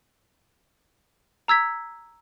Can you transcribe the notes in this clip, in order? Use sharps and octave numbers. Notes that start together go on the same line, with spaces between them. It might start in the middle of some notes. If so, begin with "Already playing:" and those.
A#5 E6 G#6 B6